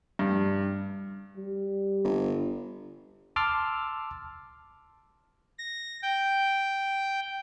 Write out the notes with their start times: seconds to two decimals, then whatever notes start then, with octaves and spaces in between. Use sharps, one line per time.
0.19 G2
1.37 G3
2.04 G1
3.36 A5 C6 D6 E6 F6
5.58 A#6
6.02 G5